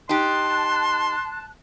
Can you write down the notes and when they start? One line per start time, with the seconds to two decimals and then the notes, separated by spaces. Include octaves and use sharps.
0.09 D#4 G4 A5 C6 F#6